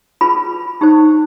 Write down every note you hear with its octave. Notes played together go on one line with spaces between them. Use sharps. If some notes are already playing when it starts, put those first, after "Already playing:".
F4 G#4 B4 B5
D#4 G4 C5